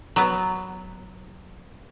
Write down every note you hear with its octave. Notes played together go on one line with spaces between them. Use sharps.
F#3 B3